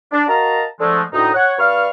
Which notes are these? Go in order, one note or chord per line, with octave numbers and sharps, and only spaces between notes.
D4
F#4 A#4 D#5 F5 A5 A#5
D3 F3 G#3 A3
D2 A2 D#4
C#5 F#5
G2 B4 D5 F5 C#6 F6